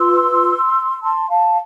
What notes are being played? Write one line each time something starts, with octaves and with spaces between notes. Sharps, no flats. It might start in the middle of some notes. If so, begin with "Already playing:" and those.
Already playing: F4 B4 C6 E6
A5 C6
F5 A5